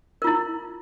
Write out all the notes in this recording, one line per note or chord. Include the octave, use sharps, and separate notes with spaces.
E4 F4 A#4